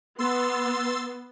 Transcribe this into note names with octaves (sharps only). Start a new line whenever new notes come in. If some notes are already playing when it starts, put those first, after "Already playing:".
B3 C6 E6 A6